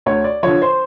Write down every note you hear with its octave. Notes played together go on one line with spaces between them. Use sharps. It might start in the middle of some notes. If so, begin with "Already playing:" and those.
D2 C#5
D5
D3 F3 C#5
C5